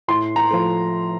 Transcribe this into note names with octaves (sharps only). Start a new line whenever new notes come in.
A2 C6
A#5
F3 A3